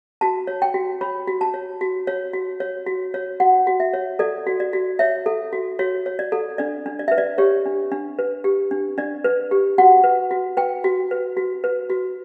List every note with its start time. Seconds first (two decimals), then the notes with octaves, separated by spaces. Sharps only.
0.21 F#4 A5
0.47 C#5
0.62 G5
0.74 F#4
1.01 C#5 B5
1.28 F#4
1.41 A5
1.54 C#5
1.81 F#4
2.07 C#5
2.33 F#4
2.60 C#5
2.86 F#4
3.14 C#5
3.40 F#4 F#5
3.67 F#4
3.80 E5
3.93 C#5
4.19 A4 D5
4.47 F#4
4.60 D5
4.73 F#4
4.99 C#5 E5
5.26 A4
5.53 F#4
5.79 F#4 C#5
6.06 C#5
6.19 D5
6.32 A4
6.58 D4 D5
6.86 D4
6.99 D5
7.08 B4 E5
7.18 D5
7.38 G4 C#5
7.66 D4
7.92 D4
8.19 B4
8.44 G4
8.71 D4
8.98 D4 D5
9.24 B4
9.51 G4
9.78 F#4 F#5
10.04 B4
10.31 F#4
10.57 B4 G5
10.84 F#4
11.11 B4
11.37 F#4
11.64 B4
11.90 F#4